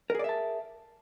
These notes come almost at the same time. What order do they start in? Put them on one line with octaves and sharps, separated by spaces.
A#4 G#4 D5 E5 A5